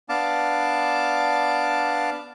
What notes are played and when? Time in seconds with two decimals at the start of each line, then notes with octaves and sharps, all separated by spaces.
0.09 B3 D4 F5 A5 D6